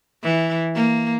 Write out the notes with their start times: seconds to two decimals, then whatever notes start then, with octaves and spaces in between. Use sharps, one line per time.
0.23 E3
0.75 A#3